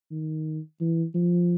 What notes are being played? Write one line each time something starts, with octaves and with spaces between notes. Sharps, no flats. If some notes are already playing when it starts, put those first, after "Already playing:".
D#3
E3
F3